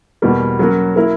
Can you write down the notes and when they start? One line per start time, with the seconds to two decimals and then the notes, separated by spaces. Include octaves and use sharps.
0.22 E2 B2 G3 A#3
0.59 F#3 A#3 C#4 F#4 A#4
0.96 A#3 E4 A#4